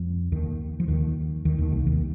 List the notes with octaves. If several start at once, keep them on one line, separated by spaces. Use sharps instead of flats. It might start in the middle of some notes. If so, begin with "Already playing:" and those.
Already playing: F2 F3
D#2 D#3
F3
D#2 D#3
D#2 D#3
D#2 D#3
C2 C3
D#2 D#3